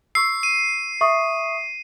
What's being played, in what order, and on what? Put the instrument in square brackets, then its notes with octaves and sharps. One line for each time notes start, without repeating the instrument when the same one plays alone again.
[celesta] C#6 E6 [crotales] C7
[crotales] D#7
[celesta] E5 C#6 D#6